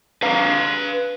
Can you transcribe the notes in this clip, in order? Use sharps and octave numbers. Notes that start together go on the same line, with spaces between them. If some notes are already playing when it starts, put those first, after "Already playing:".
B4 F5 A#5